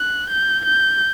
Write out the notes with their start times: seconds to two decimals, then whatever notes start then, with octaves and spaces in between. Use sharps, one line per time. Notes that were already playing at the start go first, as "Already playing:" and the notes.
Already playing: F#6
0.29 G6
0.65 G6